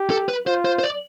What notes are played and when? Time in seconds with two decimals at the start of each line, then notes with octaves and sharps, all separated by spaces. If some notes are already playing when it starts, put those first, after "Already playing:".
Already playing: G4
0.10 A4
0.29 B4
0.46 F4 C5
0.65 C5
0.79 C5
0.83 D5